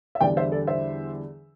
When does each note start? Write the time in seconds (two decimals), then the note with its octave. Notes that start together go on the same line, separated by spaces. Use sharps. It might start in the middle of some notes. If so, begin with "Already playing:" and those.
0.15 E5
0.21 E2 D3 G3 D4 D5 G5
0.37 C5 E5
0.52 A4 D5
0.67 C5 E5